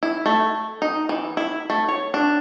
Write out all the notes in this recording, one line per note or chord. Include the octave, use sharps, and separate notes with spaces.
E4
A3
D#4
E3
E4
A3
C#5
D4